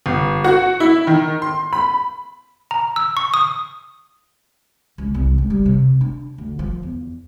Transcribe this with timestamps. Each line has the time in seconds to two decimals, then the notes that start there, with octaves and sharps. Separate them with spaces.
0.06 G1
0.44 F#4
0.80 E4
1.07 D#3
1.42 C6
1.73 B5
2.71 A#5
2.96 E6
3.17 C#6
3.34 D#6
4.98 C#2
5.14 C2
5.38 C#2
5.50 G3
5.66 C3
6.01 D4
6.38 D2
6.59 F3
6.83 E2